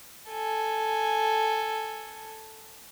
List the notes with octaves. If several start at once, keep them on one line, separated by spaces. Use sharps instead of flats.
A4 G#5